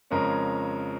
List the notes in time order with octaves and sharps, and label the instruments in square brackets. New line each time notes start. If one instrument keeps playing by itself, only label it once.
[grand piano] F2 C#3 F3 G#3 C#4 A#4